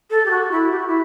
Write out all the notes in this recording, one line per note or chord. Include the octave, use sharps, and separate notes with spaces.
A4
G4
F#4
E4
G4
F#4
E4